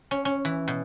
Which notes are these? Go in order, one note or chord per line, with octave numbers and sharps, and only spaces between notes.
C#4
C#4
E3
B2